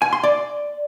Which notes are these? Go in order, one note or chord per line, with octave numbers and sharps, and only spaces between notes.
G#5
C6
D5